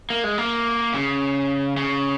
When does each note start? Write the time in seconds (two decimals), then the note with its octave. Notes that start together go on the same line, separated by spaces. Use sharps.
0.10 A#3
0.24 G#3
0.38 A#3
0.94 C#3
1.77 C#3